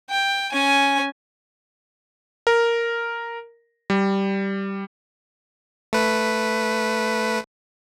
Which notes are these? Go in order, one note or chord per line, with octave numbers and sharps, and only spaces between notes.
G5
C#4 G#5
A#4
G3
A3 B4